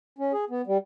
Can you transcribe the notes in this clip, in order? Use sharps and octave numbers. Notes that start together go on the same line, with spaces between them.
C#4
G#4
B3
G3